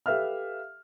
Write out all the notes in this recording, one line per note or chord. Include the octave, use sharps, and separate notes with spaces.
G4 A4 B4 E5 F5 F6